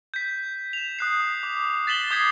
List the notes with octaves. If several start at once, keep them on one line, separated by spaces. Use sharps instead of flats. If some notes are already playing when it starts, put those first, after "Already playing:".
G6 B6
E7 F7
D#6 F#6 C7
D6
A6 B6 E7 F#7 G7
D6 D#6 G6 G#6 B6 C7